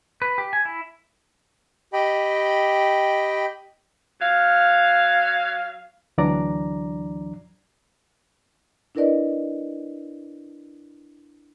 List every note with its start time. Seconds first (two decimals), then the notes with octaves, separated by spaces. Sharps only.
0.22 B4
0.38 G4
0.53 G#5
0.65 E4
1.93 G4 D#5 G5 B5
4.20 F#3 F5
6.18 D2 E3 F#3 D4 D5 A#5
8.95 D4 E4 A#4 B4 D5 D#5